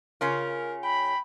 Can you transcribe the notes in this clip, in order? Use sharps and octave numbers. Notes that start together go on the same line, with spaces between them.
C#3 C#4 F4 A#4
G5 B5